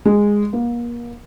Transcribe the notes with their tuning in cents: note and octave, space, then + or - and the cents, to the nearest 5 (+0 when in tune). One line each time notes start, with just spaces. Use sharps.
G#3 -10
A#3 +35